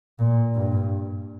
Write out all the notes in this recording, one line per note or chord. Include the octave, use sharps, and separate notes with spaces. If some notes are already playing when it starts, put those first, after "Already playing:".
A#2
G2